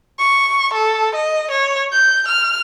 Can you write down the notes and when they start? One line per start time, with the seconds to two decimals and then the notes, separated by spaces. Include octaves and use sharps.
0.20 C#6
0.74 A4
1.15 D#5
1.51 C#5
1.92 G6
2.28 F6